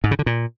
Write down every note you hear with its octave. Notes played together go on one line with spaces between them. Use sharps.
G#2
C#3
D3
A#2